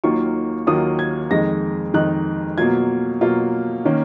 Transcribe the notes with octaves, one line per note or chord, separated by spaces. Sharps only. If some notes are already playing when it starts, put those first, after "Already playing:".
D#2 D#3 F#3 A#3 F4 C#6
D#2 D#3 F#3 A#3 F4 D#6
G#6
F2 D#3 G#3 D#4 A#6
F2 D#3 G#3 D#4 F#6
B2 F#3 A#3 F4 G#6
B2 F#3 A#3 F4
D#3 A#3 C#4